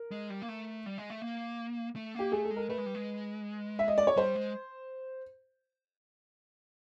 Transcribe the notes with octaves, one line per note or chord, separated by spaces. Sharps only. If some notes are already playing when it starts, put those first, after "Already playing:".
Already playing: A#4
G#3
G3
A#3
A3
G3
G#3
A3
A#3
A3
A#3 G4
A3 G#4
A4
G#3
A#4
A3 B4
G#3
G3
G#3
E5
D#5
D5
C#5
G3 C5
G#3